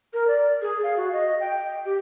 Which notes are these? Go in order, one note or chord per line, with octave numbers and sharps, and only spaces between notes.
A#4
D5
G#4
F5
F#4
D#5
G5
G4